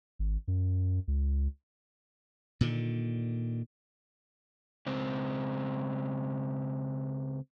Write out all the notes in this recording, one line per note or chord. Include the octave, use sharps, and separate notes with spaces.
G#1
F#2
C#2
A#2 D3 D#3
C#2 C4